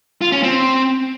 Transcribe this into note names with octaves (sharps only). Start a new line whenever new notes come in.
F4
C#4
C4